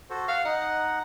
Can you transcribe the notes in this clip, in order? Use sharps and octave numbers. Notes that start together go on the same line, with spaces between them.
F#4 A4 C5
F5 F#5
D#4 D#5 F#5